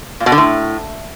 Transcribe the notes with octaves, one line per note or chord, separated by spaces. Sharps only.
A#2
B2
D3
A2